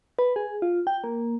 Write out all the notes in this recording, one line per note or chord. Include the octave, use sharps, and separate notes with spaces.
B4
G#4
F4
G5
A#3